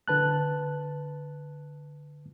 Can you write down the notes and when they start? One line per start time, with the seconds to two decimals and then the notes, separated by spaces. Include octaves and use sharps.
0.08 D3 B4 A5 F#6